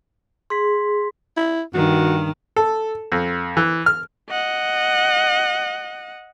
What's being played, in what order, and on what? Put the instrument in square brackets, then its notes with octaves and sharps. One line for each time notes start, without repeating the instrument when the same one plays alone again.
[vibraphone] G#4 [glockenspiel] C6 B6
[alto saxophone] E4
[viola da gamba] G2 D#3 [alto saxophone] F#4
[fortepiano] A4
F2
E3
F6
[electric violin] D#5 F#5